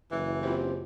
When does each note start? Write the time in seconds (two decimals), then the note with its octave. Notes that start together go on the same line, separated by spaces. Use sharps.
0.11 F#1 E3
0.43 C4 F4 G4 C5